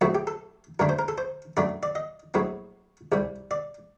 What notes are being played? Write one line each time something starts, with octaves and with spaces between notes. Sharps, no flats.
A#1 A2 F#3 A3 C4 F#4
G4
A4
F#2 D3 A3 D4 A#4
C5
A#4
A4
C5
F#2 F#3 A3 D4 D5
D5
D#5
A#1 A2 F#3 C4
C2 C3 G3
D5